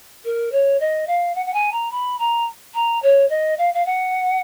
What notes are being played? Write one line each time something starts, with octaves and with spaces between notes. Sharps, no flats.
A#4
C#5
D#5
F5
F#5
F#5
G#5
A#5
B5
A#5
A#5
C#5
D#5
F5
F5
F#5